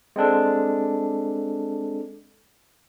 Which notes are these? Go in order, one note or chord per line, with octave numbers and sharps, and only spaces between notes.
G#3 C4 D4 A4